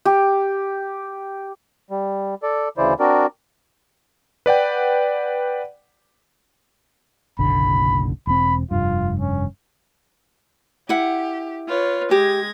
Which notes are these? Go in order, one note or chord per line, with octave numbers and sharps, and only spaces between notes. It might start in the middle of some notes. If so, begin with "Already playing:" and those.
G4
G3
A4 D5
D2 C#3 E3 E4 C5 D5
C4 D4 F#4 A#4 D5
B4 D5 F#5 G5
F#1 B1 D3 B5
E1 C4 B5
F1 G2 F4
C#4
E4 G4 F#5
F4 B4 C#5
G#3 G4 G#6 A#6